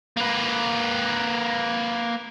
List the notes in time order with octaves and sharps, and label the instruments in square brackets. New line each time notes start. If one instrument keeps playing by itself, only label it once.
[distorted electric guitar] A#3 B4